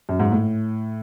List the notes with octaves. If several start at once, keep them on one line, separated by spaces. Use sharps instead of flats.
F#2
G#2
A2